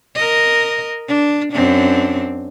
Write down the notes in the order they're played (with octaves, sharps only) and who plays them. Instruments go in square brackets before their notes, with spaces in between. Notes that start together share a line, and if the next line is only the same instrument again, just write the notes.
[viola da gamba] A#4 D#5
D4
F#2 C4 D4